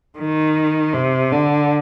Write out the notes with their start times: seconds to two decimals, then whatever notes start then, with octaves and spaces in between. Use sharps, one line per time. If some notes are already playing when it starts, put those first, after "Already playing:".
0.18 D#3
0.94 C3
1.32 D3